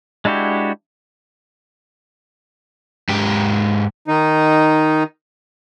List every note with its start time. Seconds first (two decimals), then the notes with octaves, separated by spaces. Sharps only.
0.25 G#3 D4 E4 F#4 G4
3.09 G#2 G4
4.08 D#3 D#4